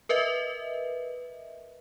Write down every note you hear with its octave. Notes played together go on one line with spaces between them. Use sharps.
A#4 B4 D#5 E5